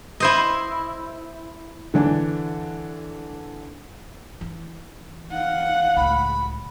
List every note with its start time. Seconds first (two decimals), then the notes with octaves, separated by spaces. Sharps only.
0.20 E4 C5 D#5
1.94 D3 E3 D4
4.41 E3
5.32 F5 F#5
5.97 C#2 A2 B5